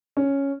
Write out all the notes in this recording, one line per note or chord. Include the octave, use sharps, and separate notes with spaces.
C#4